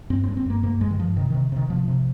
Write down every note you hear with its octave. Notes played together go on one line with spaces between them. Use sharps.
G2 C4
C4
G2
C4
G2 A#3
G2 A#3
G2 G#3
D#3
G2 F3
C3 D#3
C3 D#3
C3 D#3
C3 F3
C3